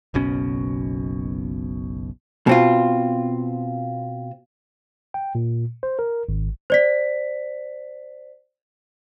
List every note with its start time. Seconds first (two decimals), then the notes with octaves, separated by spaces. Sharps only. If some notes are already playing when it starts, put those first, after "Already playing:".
0.14 F#1 B1 B2 C#4
2.47 B2 C4 F4
5.14 G5
5.35 A#2
5.83 C5
5.99 A#4
6.29 G#1
6.70 C5 D5 B6